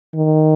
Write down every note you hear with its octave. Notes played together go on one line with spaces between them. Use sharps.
D#3